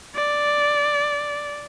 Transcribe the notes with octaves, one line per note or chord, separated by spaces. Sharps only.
D5